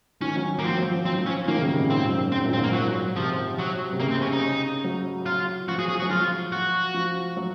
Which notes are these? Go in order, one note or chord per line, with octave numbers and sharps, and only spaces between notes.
D#3 C#4
F#3
A#3
F3 C4
F#3
F3
F#3 C4
F3
C#4
D#3 A#3
C#3
C3
A#2
G#2 C4
F#2
G#2 C4
A#2
C4
G#2
A#3
F#3
C3 F3
F#3
C3
C#3 A#3
C4
C#4
D#4
F#3
F4
F3 F#4
G#4
G#4
F#3 F#4
F3 F4
F#4
F3
F#3